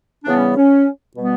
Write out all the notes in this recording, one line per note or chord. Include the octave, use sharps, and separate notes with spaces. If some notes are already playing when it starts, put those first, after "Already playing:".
C#3 E3 G3 B3 D4
C#4
C#4
B2 G3 B3